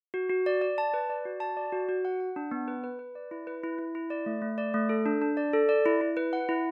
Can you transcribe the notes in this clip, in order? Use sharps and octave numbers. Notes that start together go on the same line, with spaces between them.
F#4
F#4
D5
D5
A5
B4
D5
F#4
A5
D5
F#4
F#4
F#5
F#5
D4
B3
B4
B4
B4
D5
E4
B4
E4
E4
E4
D5
A3
A3
D5
A3
A4
D4
D4
D5
A4
D5
E4
E4
B4
F#5
E4